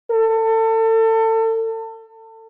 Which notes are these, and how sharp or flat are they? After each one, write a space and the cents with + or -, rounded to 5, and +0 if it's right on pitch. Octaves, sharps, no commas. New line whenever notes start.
A4 +30